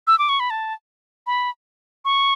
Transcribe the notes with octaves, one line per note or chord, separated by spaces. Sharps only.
E6
D6
C#6
B5
A5
B5
C#6